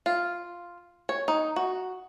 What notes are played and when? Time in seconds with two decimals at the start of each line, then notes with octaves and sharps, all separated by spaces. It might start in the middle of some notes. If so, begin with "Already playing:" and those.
0.06 F4
1.09 C#5
1.28 D#4
1.56 F#4